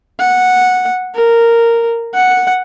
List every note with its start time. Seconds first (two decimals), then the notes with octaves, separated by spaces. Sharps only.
0.20 F#5
1.15 A#4
2.14 F#5